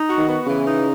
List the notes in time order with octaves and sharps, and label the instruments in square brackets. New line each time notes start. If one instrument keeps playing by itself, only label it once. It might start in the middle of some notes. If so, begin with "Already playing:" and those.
Already playing: [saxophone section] D#4
F#4
[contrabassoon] D#3
[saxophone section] B3
[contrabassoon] C#3 [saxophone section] E3
[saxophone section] D#4